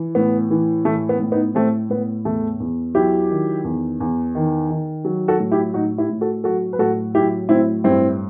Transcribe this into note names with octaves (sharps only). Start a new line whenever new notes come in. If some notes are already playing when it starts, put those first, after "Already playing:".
Already playing: E3
A2 B3
E3
A2 A3
B3
A2
B3 D#4
A2 A3 C4
A2 B3
E2 A3
E2
F#3 E4 G4
D#3
E2
E2
D#3
D#3
F#3
F#4 A4
A2
E4 G4
A2 D#4 F#4
E4 G4
A2
F#4 A4
F#3 F#4 A4
B4
A2 F#4 A4
F#3 E4 G4
A2 C4 E4
G2 C4 E4